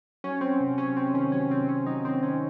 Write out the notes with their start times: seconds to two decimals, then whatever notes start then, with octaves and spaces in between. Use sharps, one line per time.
0.24 F#3 C#4
0.41 F#3 C4
0.60 C3
0.78 C3 C#4
0.96 C3 C4
1.14 D#3 C#4
1.32 F#3 C#4
1.50 C3 C4
1.69 C3 C#4
1.86 F#3 D#4
2.05 D#3 C4
2.23 D#3 C#4